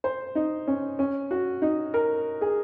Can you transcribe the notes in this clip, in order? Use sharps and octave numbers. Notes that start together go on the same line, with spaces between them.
C5
D#4
C#4
C#4
F#4
D#4
A#4
G#4